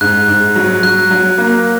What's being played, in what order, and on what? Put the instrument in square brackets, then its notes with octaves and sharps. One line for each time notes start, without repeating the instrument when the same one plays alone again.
[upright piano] G#2 [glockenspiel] F#6
[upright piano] G#2
F#3
[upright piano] F#3 [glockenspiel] F#6
[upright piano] F#3
A#3